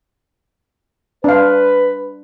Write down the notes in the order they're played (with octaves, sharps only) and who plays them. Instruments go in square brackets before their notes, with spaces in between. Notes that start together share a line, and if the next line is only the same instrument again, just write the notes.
[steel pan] D4 F5 [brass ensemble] B4